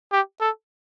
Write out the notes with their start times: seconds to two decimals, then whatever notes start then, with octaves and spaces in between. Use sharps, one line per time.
0.12 G4
0.41 A4